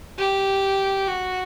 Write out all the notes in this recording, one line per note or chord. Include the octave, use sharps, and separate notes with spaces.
G4
F#4